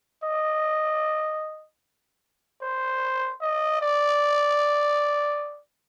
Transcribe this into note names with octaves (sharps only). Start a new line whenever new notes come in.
D#5
C5
D#5
D5